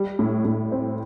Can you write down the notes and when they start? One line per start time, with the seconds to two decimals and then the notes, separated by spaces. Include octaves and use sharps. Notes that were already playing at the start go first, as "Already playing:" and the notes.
Already playing: G3
0.19 A2
0.45 A2
0.72 C4